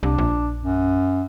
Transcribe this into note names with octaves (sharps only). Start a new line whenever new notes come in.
C2 D4
A#1
F#2